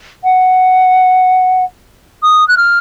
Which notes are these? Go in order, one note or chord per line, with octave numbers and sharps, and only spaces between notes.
F#5
D#6
F#6
F6